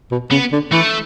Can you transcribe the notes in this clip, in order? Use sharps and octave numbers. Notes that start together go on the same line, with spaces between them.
B2
C#3 B3
D3
E3 A3